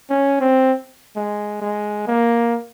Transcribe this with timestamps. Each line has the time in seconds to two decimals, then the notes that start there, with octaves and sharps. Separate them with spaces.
0.10 C#4
0.40 C4
1.16 G#3
1.61 G#3
2.07 A#3